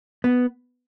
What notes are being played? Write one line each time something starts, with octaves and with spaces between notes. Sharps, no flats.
B3